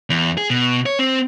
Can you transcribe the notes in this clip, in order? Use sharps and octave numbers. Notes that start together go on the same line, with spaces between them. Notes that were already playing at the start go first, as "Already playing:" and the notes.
E2
G#4
B2
C#5
C4